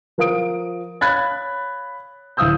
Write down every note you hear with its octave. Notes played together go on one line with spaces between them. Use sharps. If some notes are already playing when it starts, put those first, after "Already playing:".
F3 A#4 F5 D#6 D7
C#5 F5 B5 F#6 G#6 A6
D1 E4 F5 D#6 E6 G6